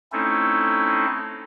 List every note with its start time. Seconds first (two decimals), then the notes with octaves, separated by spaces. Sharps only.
0.12 A3 C4 C#4 D#4 E4 A4